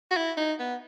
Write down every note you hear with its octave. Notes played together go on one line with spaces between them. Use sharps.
F#4
E4
D#4
B3